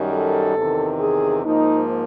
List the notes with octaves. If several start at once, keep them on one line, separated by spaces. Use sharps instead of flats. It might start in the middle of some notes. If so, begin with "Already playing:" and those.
Already playing: F#2 D#3 G3
A4
E2 C3 D#3
G#4
G#2 F3 A#3 D#4